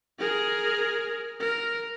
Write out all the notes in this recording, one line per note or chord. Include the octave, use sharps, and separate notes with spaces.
G#4 A#4
A#4